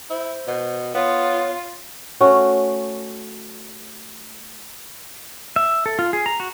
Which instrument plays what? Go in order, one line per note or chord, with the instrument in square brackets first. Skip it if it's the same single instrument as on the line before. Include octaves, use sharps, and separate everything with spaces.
[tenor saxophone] E4 [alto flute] C5
[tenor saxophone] B2
[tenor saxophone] B3 [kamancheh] F4 [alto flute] C#5
[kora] A3 C#4 F#4
[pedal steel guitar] E5
A4
F4
G#4
A#5
F#4